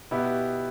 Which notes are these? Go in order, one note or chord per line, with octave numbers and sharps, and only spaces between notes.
B2 B3 E4 G4